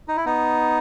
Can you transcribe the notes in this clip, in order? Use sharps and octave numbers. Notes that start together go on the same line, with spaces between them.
D#4
E4
B3 D#4